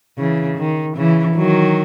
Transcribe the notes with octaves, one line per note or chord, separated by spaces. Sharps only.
C#3 E3
D#3
C#3 E3
D#3 F#3